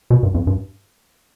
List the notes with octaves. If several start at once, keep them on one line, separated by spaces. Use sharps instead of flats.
B2
G2
F2
G2